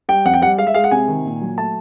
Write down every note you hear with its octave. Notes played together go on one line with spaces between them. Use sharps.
G3 G5
F2 F#5
G5
G3 F#5
G#3 F5
E5
G#3 F5
F#5
C3 G#5
D#3
A#2
F#3
A3 A5